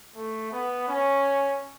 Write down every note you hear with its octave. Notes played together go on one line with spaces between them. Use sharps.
A3
B3
C#4